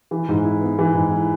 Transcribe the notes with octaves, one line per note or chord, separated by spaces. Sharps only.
E3
G#2
E4
B3
E3
G#2
E4